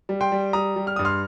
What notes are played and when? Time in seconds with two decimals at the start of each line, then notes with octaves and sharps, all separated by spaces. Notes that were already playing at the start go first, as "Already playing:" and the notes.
0.09 G3
0.21 G5 C6
0.32 G3
0.53 G3 A#5 D#6
0.76 G3
0.87 F6
0.96 G2 D#6
1.05 C6 F6